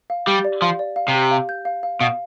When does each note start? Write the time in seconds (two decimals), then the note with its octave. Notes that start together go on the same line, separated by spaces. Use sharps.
0.10 F5
0.27 G3 G4
0.44 D5
0.62 F3 F5
0.79 D5
0.96 F5
1.08 C3
1.14 G4
1.31 F5
1.49 G6
1.65 F5
1.83 F5
2.00 B2 F5